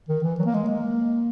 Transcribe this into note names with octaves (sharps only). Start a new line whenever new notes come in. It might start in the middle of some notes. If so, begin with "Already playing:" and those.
D#3
E3
F#3
A#3
G#3
A#3